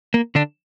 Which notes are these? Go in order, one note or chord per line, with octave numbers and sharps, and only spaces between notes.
A#3
D3 D4